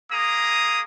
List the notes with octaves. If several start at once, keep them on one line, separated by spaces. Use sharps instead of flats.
A#3 G#4 A#5 D#6